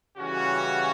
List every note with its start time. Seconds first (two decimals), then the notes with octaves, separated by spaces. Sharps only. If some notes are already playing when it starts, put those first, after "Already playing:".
0.17 C#3 E3 G3 C#4 F#4